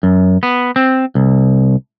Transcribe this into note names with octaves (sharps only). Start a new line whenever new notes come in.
F#2
B3
C4
C2